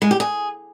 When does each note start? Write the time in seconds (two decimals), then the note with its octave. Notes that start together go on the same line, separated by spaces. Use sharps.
0.02 G#3
0.11 G4
0.20 G#4